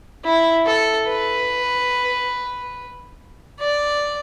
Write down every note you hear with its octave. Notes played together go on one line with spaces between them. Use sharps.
E4
A4
B4
D5